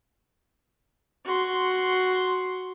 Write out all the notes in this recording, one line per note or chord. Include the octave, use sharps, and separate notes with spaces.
F#4 C6